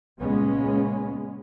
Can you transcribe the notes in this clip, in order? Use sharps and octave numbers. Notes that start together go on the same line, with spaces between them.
C#2 A#2 G#3 B3 C#4